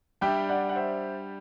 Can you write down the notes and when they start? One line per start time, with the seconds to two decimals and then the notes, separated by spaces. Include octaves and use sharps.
0.21 G3 D4 G4 E5 G5
0.49 D5 F#5
0.69 F#5
0.76 C5 E5